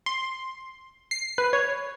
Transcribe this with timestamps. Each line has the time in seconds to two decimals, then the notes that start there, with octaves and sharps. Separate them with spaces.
0.06 C6
1.11 C7
1.38 B4
1.53 C#5